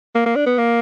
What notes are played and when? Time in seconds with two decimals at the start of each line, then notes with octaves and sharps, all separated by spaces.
0.15 A#3
0.26 A#3
0.36 D4
0.46 B3
0.58 A#3